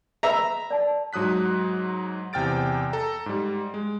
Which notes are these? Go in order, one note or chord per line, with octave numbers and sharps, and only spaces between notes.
G#4 B4 E5 A#5 B5
D5 A5
G#2 F#3 D#6 F#6 B6
E2 C3 G5 F6 A6 D7
A4 A#5
G#2 G3
G#3